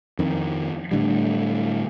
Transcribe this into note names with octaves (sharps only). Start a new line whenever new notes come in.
F2 D#3
A2 D3 G3